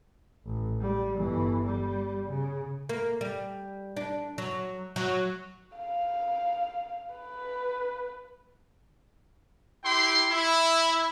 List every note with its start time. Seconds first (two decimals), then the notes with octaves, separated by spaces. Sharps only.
0.46 A1
0.81 G3
1.17 G1 E3
1.65 G3
2.29 C#3
2.89 A#3
3.21 G3
3.97 D4
4.38 F#3
4.96 F#3
5.77 F5
7.15 B4
9.84 E4 G4 G5 C6
10.29 E4